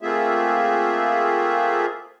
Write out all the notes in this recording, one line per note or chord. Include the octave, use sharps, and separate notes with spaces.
A3 A#3 C4 F4 G#4 E5